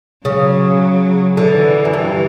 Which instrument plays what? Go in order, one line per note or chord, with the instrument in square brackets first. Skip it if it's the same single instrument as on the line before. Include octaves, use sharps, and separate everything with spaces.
[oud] C#3 [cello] F#3
[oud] D3 [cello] E3
[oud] F#2
G2